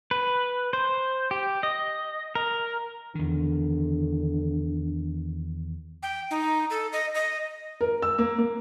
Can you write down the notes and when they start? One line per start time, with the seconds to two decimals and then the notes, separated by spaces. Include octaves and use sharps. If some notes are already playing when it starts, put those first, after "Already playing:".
0.11 B4
0.73 C5
1.31 G4
1.63 D#5
2.35 A#4
3.15 E2 D3 D#3
6.03 G5
6.31 D#4
6.70 A4
6.93 D#5
7.14 D#5
7.81 A#4
8.02 E6
8.19 A#3
8.38 A#3